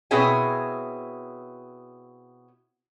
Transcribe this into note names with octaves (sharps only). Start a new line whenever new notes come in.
B2 C4 E4 G#4 C#5 G#5